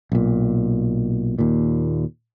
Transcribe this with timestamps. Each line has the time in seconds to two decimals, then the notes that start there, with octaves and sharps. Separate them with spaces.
0.12 B1 A#2
1.39 D#2 A#2